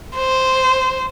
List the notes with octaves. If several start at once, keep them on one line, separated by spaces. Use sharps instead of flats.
C5